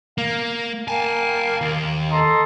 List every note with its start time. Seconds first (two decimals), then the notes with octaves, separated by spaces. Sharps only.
0.18 A#3 F5
0.88 A#3 G#5 A5
1.61 D#2
2.11 A4 D#5 A#5 C6